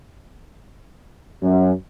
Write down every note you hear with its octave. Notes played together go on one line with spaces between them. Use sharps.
F#2